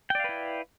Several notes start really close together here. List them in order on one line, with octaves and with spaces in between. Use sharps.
G5 D5 F5 B4 E4